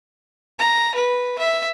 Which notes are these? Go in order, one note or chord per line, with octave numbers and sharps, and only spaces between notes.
A#5
B4
E5